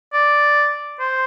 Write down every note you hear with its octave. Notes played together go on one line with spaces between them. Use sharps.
D5
C5